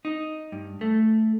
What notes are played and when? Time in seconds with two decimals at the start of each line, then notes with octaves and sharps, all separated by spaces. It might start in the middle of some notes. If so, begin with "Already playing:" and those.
0.05 D#4
0.52 G2
0.81 A3